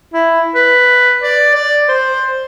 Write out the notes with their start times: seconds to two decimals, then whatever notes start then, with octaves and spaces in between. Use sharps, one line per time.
0.14 E4
0.55 B4
1.23 D5
1.55 D5
1.89 C5